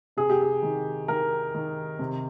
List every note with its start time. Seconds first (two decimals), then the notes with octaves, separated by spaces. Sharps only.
0.17 C3 G#4
0.30 G4
0.42 G#4
0.62 D#3
1.08 D#3 A#4
1.54 D#3
1.99 C3